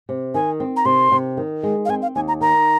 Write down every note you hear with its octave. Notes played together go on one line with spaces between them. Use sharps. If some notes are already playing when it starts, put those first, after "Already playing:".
C3
D#3 G#5
C4
A#5
C3 C6
C3
D#3
G#3
F5
C4 G#5
F5
D#2 G#5
A#5
D#3 A#5